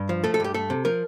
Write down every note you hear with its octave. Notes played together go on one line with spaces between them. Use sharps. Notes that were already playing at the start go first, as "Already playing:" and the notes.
Already playing: G2
F3
A3 A4
A4
G2 G4
A3 A4
C3
F3 A#4